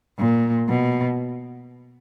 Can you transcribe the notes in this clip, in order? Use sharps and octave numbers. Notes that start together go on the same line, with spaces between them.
A#2
B2